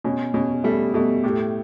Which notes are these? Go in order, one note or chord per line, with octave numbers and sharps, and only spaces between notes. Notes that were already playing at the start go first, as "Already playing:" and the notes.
B2 C#4
B2 C#4
G3 A3
B2 A3
A2 G4